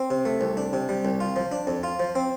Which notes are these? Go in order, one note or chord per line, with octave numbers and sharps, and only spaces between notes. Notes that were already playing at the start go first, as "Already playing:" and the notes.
Already playing: C4
C3
A3
C2
D4
C3
G3
C2
F4
F3
D4
F2
F4
F3
C4